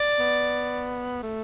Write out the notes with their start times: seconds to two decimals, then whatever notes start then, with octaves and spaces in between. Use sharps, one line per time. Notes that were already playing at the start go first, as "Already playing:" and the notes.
Already playing: D5
0.19 B3
1.23 A3